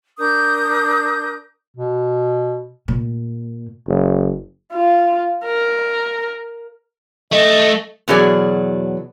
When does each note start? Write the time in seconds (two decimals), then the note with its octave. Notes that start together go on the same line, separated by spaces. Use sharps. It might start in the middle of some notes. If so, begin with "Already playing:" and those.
0.18 D4 A#4 D#6 G6
1.77 B2
2.88 A#2
3.87 F#1
4.73 F4
5.45 A#4
7.32 A3 D#5
8.08 E2 B2 F#3 G#4 D5